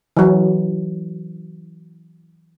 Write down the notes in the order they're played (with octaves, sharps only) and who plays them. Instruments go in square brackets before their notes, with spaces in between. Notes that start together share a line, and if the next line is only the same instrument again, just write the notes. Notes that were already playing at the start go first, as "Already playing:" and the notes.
[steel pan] E3 F#3